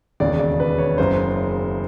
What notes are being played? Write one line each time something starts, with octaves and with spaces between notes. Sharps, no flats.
E1 D#2 C#3 D5
D5
B4
C#5
F#1 F#2 C#3 C5